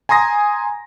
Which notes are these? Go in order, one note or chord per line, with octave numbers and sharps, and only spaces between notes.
G#5 A#5 C6 D#6 A#6